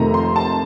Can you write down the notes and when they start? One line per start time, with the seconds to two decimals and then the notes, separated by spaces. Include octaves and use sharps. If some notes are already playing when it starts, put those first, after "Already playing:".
Already playing: F1 F2 C3 D#3 A3 A#5
0.14 C6
0.36 A5